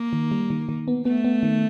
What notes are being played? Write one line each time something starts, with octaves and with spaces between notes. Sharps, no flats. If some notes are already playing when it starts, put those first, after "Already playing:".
Already playing: A#3
D#3
G3
D#3
D#3
B3
A3 B3
B3
D#3